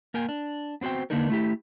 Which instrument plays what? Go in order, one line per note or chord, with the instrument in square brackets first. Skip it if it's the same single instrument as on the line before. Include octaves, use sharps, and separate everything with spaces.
[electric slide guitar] A#3 A#4 G5 G#5
D4
B3 C4 F#4 C5 G5
D3 A#3 B3 D4 D#4 A#4
A3 E4 G4